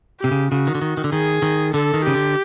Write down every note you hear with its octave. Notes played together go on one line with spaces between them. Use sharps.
C3 G4
C#3
C#3 F#4
D#3
D3
D#3
D#3
D3
D#3 G#4
D#3
D3 A4
D#3
C#3 G4
D3